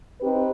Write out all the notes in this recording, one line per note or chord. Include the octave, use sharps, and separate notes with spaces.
C4 D#4 G4 B4